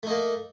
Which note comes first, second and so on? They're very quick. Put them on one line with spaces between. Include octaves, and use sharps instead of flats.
A3 D#4 A#3